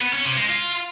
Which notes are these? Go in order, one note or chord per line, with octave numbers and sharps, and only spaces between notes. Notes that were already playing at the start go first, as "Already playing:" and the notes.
B3
C#4
C3
G#3
F4